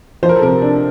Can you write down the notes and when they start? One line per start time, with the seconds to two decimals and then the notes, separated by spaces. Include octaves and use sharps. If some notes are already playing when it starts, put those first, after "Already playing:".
0.23 F3 C5
0.29 A#4
0.36 A4
0.42 C3 A#4
0.62 D4